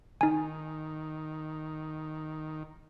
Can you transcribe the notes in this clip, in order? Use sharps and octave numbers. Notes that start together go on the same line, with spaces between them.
D#3 D#4 G#5